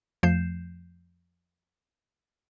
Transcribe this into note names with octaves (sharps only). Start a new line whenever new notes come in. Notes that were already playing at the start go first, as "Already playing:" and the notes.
F2 F3 A3 G6 C7 E7